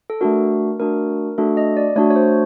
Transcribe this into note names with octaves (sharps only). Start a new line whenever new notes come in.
A4
A3 D4 F#4 A#4
A3 D4 F#4 A#4
A3 D4 F#4 A4
D#5
D5
A3 D4 F#4 C#5
C#5
C5